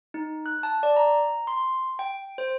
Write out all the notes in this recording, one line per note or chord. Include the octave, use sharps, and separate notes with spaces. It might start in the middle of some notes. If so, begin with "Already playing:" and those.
D#4
F#6
A5
D5
A#5
C6
G5
C5